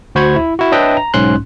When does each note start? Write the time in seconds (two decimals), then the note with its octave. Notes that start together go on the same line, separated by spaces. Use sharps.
0.15 D2 F#4 C5 B5 C#6 G#6
0.36 E4
0.59 E4 F#4
0.72 D4 B4 C#5 D#5 E5 G5
0.97 A#5
1.14 B1 G#2 C#4 C6 F#6